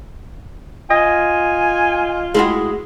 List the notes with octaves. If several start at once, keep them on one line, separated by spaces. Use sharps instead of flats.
F4 D#5 G#5
G#3 E4 F#4